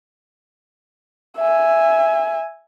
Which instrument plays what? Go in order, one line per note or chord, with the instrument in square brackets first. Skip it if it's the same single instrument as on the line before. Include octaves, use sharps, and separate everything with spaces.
[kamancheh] E5 G#5